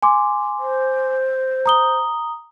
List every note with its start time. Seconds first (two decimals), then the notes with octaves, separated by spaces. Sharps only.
0.02 G#5 C6 D6
0.59 C5
1.66 A#5 D#6 G7